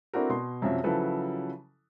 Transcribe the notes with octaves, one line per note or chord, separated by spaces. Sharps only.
C4 D4 E4 F#4 A4 A#4
B2 C6
F#2 C3 F3 F#3 E5
C#3 F3 F#3 E4 A4 B4